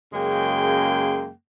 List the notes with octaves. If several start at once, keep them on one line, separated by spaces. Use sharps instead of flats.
F#2 C#3 G#3 A#3 G5